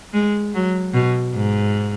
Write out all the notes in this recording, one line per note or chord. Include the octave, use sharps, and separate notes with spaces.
G#3
F#3
B2
G#2